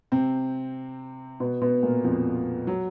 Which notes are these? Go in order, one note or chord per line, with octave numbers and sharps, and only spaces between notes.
C3 C4
B2 B3
B2 B3
A#2 A#3
F2 F3
F#3